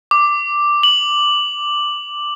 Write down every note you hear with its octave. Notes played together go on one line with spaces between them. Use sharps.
D6
F#7